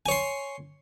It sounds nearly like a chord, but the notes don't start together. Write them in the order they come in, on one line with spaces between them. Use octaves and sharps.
G#5 C#5 C6